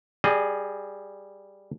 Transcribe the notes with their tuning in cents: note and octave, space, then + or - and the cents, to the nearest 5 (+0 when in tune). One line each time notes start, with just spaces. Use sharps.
G3 +0 G#4 +0 D#5 -35